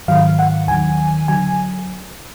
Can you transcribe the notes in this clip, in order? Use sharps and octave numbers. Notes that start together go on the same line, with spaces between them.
G#2 D#3 F#3 F5
F#5
D#2 D#3 F#3 G#5
D3 F#3 G#5